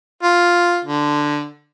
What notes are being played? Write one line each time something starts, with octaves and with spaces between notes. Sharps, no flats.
F4
D3